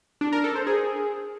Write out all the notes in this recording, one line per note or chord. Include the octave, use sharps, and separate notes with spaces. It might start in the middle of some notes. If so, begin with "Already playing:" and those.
D4
A#4
A4
C5
G#4